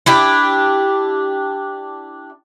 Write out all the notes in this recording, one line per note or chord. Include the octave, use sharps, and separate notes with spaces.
D4 E4 G4